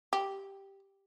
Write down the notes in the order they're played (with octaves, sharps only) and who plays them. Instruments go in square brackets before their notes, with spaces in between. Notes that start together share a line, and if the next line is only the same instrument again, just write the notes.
[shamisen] G4